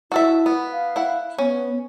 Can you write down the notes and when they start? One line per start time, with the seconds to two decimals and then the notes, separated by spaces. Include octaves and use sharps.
0.12 E4 F#4 A4 E5
0.46 B3
0.72 F5
0.96 E4 F#5
1.38 B3 C#4